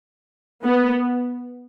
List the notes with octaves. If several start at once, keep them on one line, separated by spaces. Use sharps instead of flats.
B3